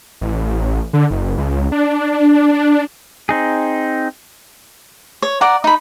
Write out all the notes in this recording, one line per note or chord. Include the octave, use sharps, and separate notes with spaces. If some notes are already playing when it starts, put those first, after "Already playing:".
A1
D3
F#1
C#2
D4
D4
C4 D#4 G#4
C#5
D5 F#5 A#5
D#4 B5